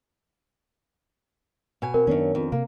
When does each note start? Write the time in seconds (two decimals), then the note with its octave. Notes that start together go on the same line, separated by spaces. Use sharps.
1.82 B2 G#5
1.94 C4 A#4
2.07 F#2 D#3 B3 C#4 D4
2.35 F2
2.52 C3 A#3